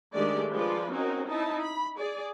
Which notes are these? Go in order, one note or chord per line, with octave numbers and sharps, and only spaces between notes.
D#3 G#3 A3 D4 G4 D5
F3 G#3 F4 B4 D5
C4 C#4 D#4 F#4 A#4
D#4 E4 A5
B5
G#4 D5